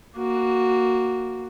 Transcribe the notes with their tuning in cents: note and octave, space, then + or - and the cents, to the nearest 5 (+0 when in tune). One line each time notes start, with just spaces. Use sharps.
A#3 +0 F#4 +0